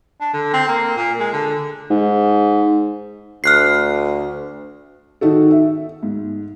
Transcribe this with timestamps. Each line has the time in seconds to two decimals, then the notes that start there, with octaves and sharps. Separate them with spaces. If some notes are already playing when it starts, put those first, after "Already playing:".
0.21 D4
0.34 D3
0.53 C4
0.68 A#3
0.97 A#2
1.20 G#3
1.33 D3
1.90 G#2
3.44 D2 F6 F#6 C7
5.21 D#3 D#4 F#4 A4
5.51 E5
6.03 G#2